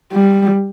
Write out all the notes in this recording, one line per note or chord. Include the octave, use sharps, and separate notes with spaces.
G3